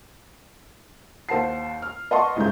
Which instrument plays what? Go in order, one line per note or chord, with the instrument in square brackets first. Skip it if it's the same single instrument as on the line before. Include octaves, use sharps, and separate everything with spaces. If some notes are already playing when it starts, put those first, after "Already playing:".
[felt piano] D#2 C5 F#5 A5 C7
F6
B4 D#5 F#5 A5 C6 C#6
C2 G#2 C#3 A3 G6